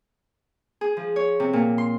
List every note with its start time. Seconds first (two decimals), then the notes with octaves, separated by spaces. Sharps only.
0.81 G#4
0.97 F3
1.16 C#5
1.40 C3
1.53 A#2
1.78 C6